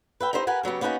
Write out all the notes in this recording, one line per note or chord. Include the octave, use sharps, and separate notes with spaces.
B4 E5 G5
D#4 E4 G4 C5 D5 D#5
G4 A#4 B4 F#5 G#5
C#3 F#3 B3 G4
A#3 B3 C#4 D#4 F#4 B4